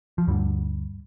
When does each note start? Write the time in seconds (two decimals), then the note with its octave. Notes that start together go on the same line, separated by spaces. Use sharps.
0.18 F3
0.27 D2 G2 D3 G3